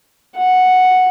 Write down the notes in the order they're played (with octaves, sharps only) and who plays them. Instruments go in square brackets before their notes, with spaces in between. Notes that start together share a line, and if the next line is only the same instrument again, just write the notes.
[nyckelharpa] F#5